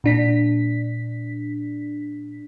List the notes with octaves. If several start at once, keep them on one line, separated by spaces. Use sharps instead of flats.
A#2 D4 B6